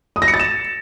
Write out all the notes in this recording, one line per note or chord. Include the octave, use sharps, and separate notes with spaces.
D#6
A#6
C#7
A6
E7